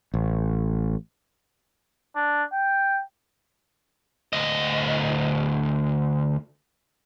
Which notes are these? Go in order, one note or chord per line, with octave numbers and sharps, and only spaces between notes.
A1
D4
G5
D2 D#5